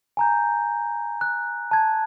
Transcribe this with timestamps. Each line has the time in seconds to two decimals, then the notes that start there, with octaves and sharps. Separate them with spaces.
0.17 G#5 A#5 G6
1.21 F#6
1.71 A5 G#6